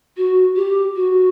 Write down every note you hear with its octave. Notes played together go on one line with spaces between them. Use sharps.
F#4
G4
F#4